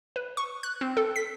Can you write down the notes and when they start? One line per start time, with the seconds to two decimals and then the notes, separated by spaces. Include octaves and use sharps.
0.16 B4
0.37 C#6
0.63 F#6
0.81 C4
0.97 A4
1.16 B6